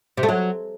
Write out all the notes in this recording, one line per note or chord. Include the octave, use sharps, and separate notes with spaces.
C3
A3
F#3